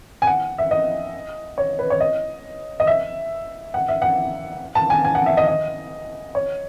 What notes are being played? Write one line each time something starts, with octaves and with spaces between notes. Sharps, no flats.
G#5
F#5
E5
D#5
C#5
B4
C#5
D#5
D#5
E5
F#5
E5
F#5
A5
G#5
G#5
F#5
E5
D#5
D#5
C#5